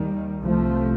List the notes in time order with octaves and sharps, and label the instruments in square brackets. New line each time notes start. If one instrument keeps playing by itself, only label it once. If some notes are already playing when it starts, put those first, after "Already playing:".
Already playing: [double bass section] D#2 D#3 G3
C2 C3 F3 A3